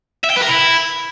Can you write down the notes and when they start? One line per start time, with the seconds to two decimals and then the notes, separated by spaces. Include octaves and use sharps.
0.24 E5
0.30 G5
0.36 B4
0.42 A#4
0.48 E4